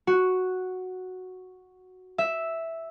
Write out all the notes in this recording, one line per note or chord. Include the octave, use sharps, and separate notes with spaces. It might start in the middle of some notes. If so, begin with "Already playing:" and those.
F#4
E5